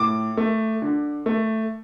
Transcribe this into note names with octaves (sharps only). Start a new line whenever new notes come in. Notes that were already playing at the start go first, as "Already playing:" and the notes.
Already playing: A2 D6
A3
D3
A3